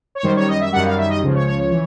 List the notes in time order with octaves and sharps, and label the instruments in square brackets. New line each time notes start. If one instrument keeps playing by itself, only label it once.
[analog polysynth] C#5
F#2 D#3 G3 C5
C#5
D#5
E5
F#2 D#3 G3 F#5
F5
E5
D#5
C#2 C#3 F3
C#5
C#5
C#5
E3